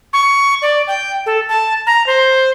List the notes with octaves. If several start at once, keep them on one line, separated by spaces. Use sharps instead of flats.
C#6
D5
G5
A4
A5
A#5
C5